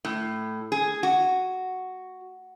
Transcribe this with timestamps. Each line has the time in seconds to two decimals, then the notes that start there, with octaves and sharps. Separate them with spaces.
0.05 A2
0.72 G#4
1.03 F#4